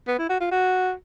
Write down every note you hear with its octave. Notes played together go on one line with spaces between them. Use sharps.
B3
E4
F#4
F4
F#4